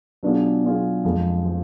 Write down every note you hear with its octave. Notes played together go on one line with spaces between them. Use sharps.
B2 F#3 D4 F4 G#4
B2 F#3 D4 F4 G#4
F2 F3 G#3
F3 G#3